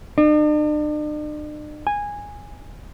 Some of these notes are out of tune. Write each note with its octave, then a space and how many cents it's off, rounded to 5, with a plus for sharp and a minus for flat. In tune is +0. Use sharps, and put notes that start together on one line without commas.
D4 +45
G#5 -10